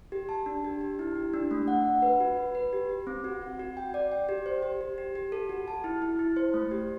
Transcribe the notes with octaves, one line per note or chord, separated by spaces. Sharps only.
G4
A5
D4
G4
G4
E4
G4
D4
A3
F#5
F#5
B4
F#4
B4
B4
G4
G4
C4
F#4
F#4
F#4
G5
D5
G5
G4
C5
G4
G4
G4
G4
A4
F#4
A5
E4
E4
E4
C5
A3
G4